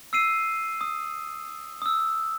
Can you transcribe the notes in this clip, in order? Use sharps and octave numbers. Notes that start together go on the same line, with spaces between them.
E6 C7 D#7
D#6
D#6 E6